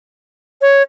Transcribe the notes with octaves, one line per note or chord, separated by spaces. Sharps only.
C#5